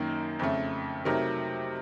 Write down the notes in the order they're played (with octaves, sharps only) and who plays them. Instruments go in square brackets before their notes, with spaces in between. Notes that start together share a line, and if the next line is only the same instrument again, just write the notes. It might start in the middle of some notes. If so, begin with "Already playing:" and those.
Already playing: [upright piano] F#2 D#3 A#3 D#4
F2 C#3 A3
C3 F#3 A3 D#4 A#4